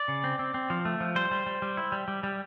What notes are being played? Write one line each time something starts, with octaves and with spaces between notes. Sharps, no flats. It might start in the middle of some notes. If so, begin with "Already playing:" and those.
Already playing: D5
C#3
C4
C4
C4
F3
A3
F3
G3 C5
G3
G3
G3
E4
G3
G3
G3